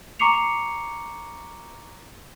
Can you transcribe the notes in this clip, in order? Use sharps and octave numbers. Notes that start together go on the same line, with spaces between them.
A#5 C#6 D6 C7 C#7 F7